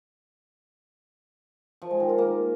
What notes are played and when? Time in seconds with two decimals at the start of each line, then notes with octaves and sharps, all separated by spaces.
1.82 F3
1.91 G#3
2.00 D#3
2.09 F4
2.18 A#3